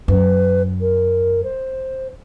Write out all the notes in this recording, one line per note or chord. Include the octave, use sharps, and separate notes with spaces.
F#2 B4
A#4
C5